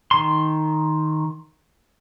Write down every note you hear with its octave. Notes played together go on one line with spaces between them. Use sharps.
D#3 C6